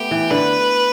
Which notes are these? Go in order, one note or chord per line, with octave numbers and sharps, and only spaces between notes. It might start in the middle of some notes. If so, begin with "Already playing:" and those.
Already playing: A3 B3 G4
E3
D3 B4